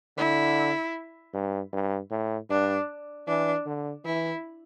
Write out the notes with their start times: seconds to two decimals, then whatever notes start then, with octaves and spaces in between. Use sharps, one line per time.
0.17 D3 E4
1.34 G2
1.73 G2
2.11 A2
2.50 G2 D4
3.27 E3 D4
3.66 D3
4.05 E3 E4